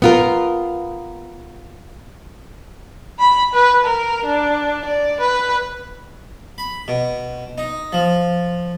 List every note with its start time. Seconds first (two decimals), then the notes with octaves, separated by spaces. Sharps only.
0.02 B3 F4 A#4
3.20 B5
3.54 B4
3.85 A#4
4.26 D4
4.86 D5
5.21 B4
6.58 B5
6.88 B2
7.58 D#4
7.93 F3